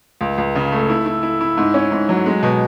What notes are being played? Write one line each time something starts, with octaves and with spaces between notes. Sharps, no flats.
C#2
C#2
C#3
A3
E4
E4
E4
E4
G#2
C#4
G#2
F#3
G#3
B2